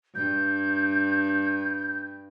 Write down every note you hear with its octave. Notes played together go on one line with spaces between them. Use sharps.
G2 G6